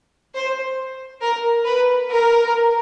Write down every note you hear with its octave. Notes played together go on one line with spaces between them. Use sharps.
C5
A#4
B4
A#4